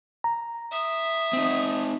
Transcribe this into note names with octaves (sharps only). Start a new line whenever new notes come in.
A#5
E5 D#6
C4 D#4